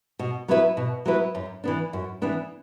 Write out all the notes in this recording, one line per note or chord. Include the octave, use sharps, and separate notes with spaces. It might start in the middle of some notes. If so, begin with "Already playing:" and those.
B2
F#3 B3 E4 B4
B2
F#3 B3 E4 B4
F#2
E3 B3 D4
F#2
E3 B3 D4